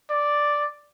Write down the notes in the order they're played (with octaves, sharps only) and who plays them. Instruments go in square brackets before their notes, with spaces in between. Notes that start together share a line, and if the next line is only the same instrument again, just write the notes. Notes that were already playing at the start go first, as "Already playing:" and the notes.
[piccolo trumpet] D5